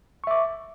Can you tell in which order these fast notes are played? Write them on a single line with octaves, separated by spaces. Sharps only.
C#6 E5 D6